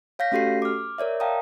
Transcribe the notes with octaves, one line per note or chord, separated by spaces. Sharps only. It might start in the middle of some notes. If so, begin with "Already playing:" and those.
C#5 F5 G6 A#6 B6
A3 C#4 F#4 G4 A4 C7
D6 F6
A#4 C#5 D5 E5
F5 G5 A5 A#5 D#6